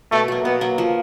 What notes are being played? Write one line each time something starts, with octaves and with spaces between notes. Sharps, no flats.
B2 A3
F#3 A#3
B2 B3
F#3 A#3
F3